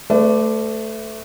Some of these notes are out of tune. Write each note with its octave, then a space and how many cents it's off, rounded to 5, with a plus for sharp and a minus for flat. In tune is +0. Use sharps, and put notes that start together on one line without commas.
A3 +0 B4 +40 D5 +0